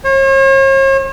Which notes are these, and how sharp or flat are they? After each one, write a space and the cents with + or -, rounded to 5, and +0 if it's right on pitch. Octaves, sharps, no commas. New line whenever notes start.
C#5 -45